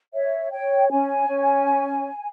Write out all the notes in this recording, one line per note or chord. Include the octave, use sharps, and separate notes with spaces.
C#5 E5
C#5 G5
C#4 G#5
C#4